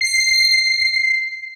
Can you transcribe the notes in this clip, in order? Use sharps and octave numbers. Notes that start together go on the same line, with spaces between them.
C7